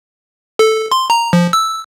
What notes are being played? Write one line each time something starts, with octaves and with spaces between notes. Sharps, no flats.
A4
C6
A#5
F3
E6